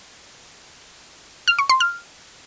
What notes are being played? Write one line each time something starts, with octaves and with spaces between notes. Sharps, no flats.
F6
C#6
C6
F6